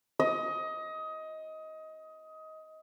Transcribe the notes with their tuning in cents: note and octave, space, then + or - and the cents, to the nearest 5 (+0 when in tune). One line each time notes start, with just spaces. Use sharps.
D#5 +20